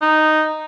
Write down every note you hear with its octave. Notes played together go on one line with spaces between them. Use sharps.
D#4